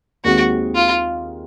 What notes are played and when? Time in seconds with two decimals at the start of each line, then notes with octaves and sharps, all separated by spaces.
0.24 D#2 D#3 G#3 C4 F#4
0.75 F4